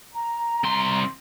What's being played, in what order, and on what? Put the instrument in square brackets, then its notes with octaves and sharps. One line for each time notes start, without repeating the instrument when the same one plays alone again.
[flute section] A#5
[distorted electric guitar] C2 C6